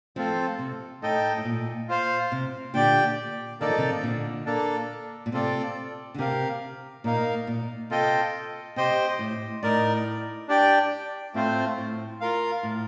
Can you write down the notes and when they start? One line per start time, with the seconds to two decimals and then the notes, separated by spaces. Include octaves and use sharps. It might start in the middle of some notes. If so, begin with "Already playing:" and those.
0.16 F3 A3 C4 F4 A4
0.59 C3
1.02 A2 D#4 A4 D#5 G5
1.37 A2
1.45 A#2
1.88 F4 C5 F5
2.32 C3
2.74 A#2 D3 G4 D5 G5
3.60 D#3 A#3 D#4 A4 D5
3.70 F3
3.78 C3 D#3
4.03 A#2 D3
4.46 A#3 D4 A4
5.26 A#2
5.32 C3 C4 F4 A4 D5
6.14 D3
6.18 C3 G4 A#4 F5
7.04 A#2 A#3 D#4 A#4 F5
7.47 A#2
7.90 C3 F4 A4 D#5 G5
8.76 C3 G4 C5 D#5 G5
9.19 A2
9.63 A2 D#4 A#4 D5
10.48 D4 G4 D5 G5
11.34 A2 A3 C4 F4 C5
11.78 A2
12.21 F4 A#4 F5
12.63 A2